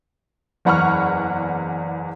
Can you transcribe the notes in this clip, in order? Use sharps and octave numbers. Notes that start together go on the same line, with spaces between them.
F#1 E2 F#5 B5 C#6 F6